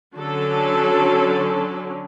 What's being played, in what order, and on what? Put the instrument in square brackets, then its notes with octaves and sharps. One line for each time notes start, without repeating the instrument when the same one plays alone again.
[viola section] D3 F#3 C#4 A4